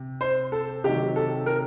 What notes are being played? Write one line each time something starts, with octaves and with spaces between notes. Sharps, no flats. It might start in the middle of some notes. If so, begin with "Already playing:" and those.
Already playing: C3
C5
A4
C3 D#3 F#3 G4
A4
A#4